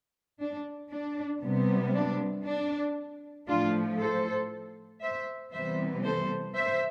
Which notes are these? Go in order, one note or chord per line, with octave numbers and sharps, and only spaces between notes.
D4
D4
C3 G3 B3
D4
D4
A2 F3 A3 D4 F4
A4 C5
C5 E5
C3 E3 G3 B3 C5 E5
A4 C5
C5 E5